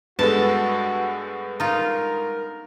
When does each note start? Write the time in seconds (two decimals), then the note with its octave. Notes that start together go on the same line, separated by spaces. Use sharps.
0.19 G2 G#3 B3 F#4 A4 A5
1.60 D#4 F4 A#4